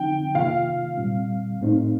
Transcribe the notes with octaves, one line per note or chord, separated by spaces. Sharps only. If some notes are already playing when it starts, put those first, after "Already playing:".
Already playing: D3 F3 C4 D#4 G5
C3 D#3 A#3 F4 F5
A#2 G3 C4
A2 A3 C4 D#4